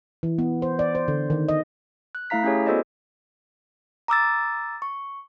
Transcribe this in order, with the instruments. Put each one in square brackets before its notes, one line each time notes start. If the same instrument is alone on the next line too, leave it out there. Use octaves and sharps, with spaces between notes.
[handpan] E3
B3
C5
D5
C5
D3
D#3
D#5
[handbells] F#6
A3 E4 F5 A#5 B6
C#4 E4 G4 G#4 C#5
B3 F#4 A4 C5 D5 D#5
[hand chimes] A#5 D6 E6 A6
C#6